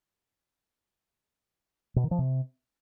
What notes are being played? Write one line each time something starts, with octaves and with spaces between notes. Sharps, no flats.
B2
D#3
F3
C3